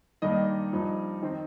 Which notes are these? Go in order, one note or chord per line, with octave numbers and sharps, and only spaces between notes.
G2 D#3 G3 A#3 D#5
G2 F3 D#4
D#3 C4 D#4